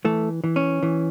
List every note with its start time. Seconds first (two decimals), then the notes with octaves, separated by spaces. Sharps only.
0.05 E3 A3
0.44 E3
0.56 C#4
0.83 E3